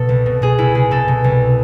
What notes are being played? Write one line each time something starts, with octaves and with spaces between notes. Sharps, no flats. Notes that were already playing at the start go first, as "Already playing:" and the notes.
Already playing: B2 A4
C2
B2
B2 G#4
C2 E4
C2 G#4
B2 A4
B2
C2